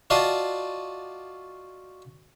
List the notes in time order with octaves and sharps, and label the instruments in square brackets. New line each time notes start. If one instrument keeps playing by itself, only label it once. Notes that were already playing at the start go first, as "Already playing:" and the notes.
[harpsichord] F4 F#4 D5 D#5 A5 C6